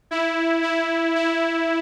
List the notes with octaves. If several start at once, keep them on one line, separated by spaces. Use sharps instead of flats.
E4
E4
E4